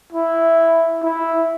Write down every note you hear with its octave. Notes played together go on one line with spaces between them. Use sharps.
E4
E4